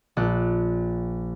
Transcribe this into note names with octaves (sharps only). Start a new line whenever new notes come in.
A#1 F#6